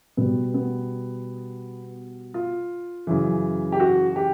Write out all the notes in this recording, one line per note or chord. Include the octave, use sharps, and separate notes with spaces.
B2 G3 B3
B3
F4
F#2 C#3 E3
G4
F#4
G4